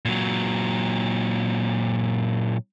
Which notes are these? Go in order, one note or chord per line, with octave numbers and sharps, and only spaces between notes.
A#2 F#3